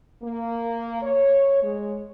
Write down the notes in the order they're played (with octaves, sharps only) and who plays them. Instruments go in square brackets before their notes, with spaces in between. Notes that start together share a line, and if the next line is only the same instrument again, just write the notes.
[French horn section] A#3
C#5
G#3